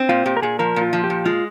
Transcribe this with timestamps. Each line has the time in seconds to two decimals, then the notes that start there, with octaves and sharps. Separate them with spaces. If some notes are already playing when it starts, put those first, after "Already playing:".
Already playing: C4
0.09 A#2 F4
0.26 A#2 G4
0.37 A#4
0.42 A#2 G#4
0.59 F3 A#4
0.76 A#2
0.81 F4
0.93 F3
1.04 G4
1.10 A#2
1.25 G#3 F4